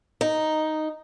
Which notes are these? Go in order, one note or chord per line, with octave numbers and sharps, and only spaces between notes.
D#4